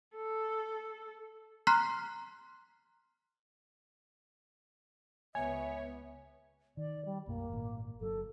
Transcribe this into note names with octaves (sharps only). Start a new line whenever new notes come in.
A4
A#5 C6 F6 F#6 B6 C7
C#2 B3 C#5 E5 G#5
D#3 D5
G3
B1 F#2 A3 A#3
G#1 A#2
G1 F#3 A4